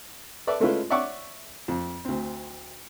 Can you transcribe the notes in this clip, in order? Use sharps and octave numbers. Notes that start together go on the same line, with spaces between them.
A4 B4 D5 E5
G#3 A3 C#4 E4 F4 B4
C#5 D5 E5 F#5 C#6 D6
F2
D2 C4